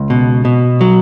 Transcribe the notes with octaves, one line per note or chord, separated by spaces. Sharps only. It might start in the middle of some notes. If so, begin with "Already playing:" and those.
Already playing: C#2
B2
B2
F#3